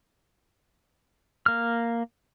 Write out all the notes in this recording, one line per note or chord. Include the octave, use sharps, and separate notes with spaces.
A#3 F6